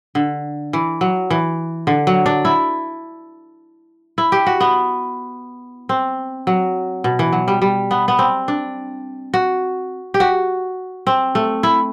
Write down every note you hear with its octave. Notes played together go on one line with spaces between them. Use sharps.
D3
E3
F#3
E3
D3
F#3
D4
E4
E4
G4
F#4
B3
C4
F#3
B2
E3
F#3
G3
G3
B3
B3
C4
D4
F#4
G4
F#4
C4
A3
E4